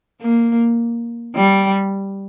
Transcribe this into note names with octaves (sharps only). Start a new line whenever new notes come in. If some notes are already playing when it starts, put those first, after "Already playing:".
A#3
G3